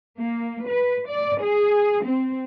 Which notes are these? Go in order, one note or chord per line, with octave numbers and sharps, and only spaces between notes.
A#3
B4
D5
G#4
C4